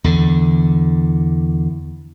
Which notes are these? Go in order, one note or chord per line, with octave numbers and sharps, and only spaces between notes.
E2 D3